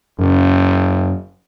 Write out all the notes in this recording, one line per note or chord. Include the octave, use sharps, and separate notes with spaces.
F#1 F#2 C#3